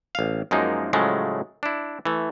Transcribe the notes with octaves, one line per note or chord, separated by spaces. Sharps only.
A1 F5
F#2 F3 G#3 A#3 D#4
A2 C#3 F3 F#3 G#3 A3
D4 E4
E3 A3